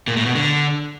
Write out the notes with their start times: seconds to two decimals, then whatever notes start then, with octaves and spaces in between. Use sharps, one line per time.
0.07 A#2
0.17 A2
0.26 B2
0.35 D3